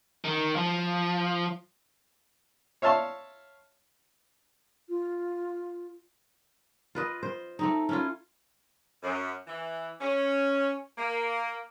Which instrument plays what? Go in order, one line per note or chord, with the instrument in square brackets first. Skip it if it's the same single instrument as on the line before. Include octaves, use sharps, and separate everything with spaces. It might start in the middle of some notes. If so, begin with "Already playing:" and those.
[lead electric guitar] D#3
F3
[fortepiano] C#5 E5 F5 A5 C6
[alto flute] F4
[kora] F4 B4 D#5
C5
A3 C4 D#4
C#4 E4 F4
[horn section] F#2
E3
C#4
A#3